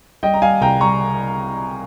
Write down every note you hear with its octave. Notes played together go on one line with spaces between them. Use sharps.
G3 D#5 G5
A#5
G3 F5 G#5
C2 G5 A#5
G3 A#5 C#6